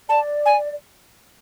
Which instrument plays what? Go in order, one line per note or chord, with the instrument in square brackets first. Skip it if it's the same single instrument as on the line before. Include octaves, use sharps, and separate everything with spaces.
[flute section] D5 [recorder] A5
[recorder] G#5